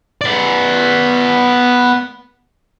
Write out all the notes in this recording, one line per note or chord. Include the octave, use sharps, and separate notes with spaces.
B3 D5